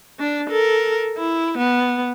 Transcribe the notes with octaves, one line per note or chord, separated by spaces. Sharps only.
D4
A4 A#4
E4
B3